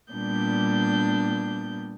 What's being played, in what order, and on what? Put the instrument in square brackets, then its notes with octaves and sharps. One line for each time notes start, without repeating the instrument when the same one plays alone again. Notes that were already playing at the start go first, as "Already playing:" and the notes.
[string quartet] A#2 G3 B3 D4 G6